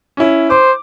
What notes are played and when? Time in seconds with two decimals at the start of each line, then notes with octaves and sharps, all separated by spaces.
0.17 C#4 E4
0.50 C5 D6